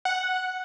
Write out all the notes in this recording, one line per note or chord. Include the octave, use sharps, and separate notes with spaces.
F#5